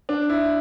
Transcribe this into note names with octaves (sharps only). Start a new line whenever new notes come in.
D4
E4